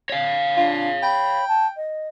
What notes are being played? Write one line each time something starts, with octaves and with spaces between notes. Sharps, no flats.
C#5 F5
D4 F4
G5 B5
A5
D#5